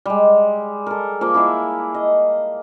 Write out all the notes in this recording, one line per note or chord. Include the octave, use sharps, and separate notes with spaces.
G3 G#3
A4 A#4
F3 A#3 D6
E4 G#4 E5 F#5
D#5